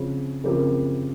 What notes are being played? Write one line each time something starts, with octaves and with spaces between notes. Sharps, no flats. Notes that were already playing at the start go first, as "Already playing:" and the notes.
Already playing: C#3 F3 C4
C#3 F3 C4 G4 A#4